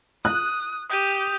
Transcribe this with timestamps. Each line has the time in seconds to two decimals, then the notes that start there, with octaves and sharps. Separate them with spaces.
0.25 D#6 F#6
0.90 G4 D#6 G6 D#7